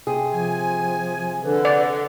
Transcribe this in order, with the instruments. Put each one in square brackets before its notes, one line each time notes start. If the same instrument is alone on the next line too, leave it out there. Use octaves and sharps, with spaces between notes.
[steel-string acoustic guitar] C3 G#4
[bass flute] F3 [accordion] G#5
[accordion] D3 [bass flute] B4
[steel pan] D5